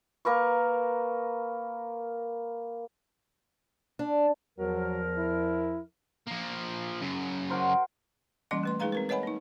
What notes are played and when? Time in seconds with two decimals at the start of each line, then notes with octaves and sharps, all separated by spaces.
0.25 A#3 A#4 B4 C#6
3.99 D4
4.59 E2 F3 F#3 A#4
5.18 E4
6.27 F3 A#3
7.02 F#2 C#3
7.50 F#4 A#4 C5
8.51 E3 G3 A#3 C#4 D#5 C6
8.63 A3 B4 C6
8.80 G#3 D#4 G#4 B4 F5 A#5
8.92 C4 A#4 B4
9.09 B4 C#5 D#5 F#5 G#5 B5
9.23 A#3 D#4